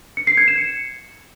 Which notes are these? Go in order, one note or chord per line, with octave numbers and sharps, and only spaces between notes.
C#7
C7
G#6
E7
C#7